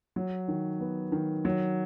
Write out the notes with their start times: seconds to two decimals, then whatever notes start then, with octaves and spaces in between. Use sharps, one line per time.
0.16 F#3
0.48 D#3
0.80 B3
1.12 D#3
1.45 F#3